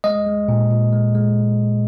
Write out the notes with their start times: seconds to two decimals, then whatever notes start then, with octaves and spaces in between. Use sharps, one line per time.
0.04 G#3 D#5
0.26 G#3
0.49 A#2
0.71 A#2
0.93 G#3
1.15 G#3